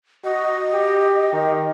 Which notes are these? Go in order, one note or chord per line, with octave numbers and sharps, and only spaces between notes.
F#4 D#5
G4
D#3